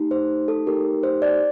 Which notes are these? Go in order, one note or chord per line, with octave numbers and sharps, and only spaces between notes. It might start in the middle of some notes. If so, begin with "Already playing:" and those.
Already playing: A3 D#4 G4
C5
A4
A3 D#4 G4 A#4
C5
D5